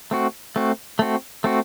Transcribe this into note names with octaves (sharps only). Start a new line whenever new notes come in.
A3 C4 F#4
A3 C4 F#4
A3 C4 F#4
A3 C4 F#4